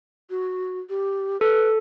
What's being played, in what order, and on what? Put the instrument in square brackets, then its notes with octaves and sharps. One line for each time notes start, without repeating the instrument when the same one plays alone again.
[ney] F#4
G4
[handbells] A4 [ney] B4